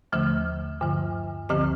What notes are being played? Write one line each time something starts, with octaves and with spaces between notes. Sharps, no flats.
D#2 D3 F3 A3
G2 D3 F3
D2 D3 F3 C4 G4